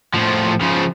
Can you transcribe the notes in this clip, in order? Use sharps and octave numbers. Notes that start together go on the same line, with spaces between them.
A2 F3
C#3 F3